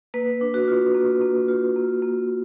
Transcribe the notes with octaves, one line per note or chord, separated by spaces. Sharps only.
A#3 B4
D4
F#4
F4
A#3
A#3
F4
A#3
A#3